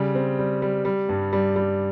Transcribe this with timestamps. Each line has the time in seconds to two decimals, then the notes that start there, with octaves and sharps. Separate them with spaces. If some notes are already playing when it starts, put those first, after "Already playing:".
Already playing: C#3 G3
0.15 C4
0.39 G3
0.62 G3
0.85 G3
1.09 G2
1.33 G3
1.56 G3